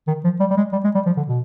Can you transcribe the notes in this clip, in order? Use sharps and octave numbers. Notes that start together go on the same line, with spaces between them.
D#3
F3
G3
G3
G#3
G3
G#3
G3
F3
D3
B2